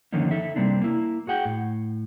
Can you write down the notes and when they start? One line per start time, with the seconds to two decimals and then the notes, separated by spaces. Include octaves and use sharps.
0.13 D3 D#3 F3 A#3 C#4 D#4
0.31 D#4 A4 E5
0.56 C3 G3 A#3 C4 D4
0.82 A#3 E4
1.27 F#4 G#4 F#5 G5
1.45 A2